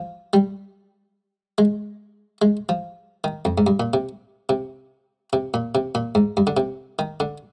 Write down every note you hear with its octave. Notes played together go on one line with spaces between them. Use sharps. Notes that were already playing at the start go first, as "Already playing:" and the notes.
Already playing: F3
G3
G#3
G#3
F3
D#3
F2
G#2
G2
A#2
C3
C3
C3
A#2
C3
A#2
G#2
G2
D3
C3
D#3
D3